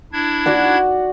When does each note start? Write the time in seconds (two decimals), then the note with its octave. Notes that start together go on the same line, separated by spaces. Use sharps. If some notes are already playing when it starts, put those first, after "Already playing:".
0.13 D4 E4 G#6
0.46 F#4 D5 F#5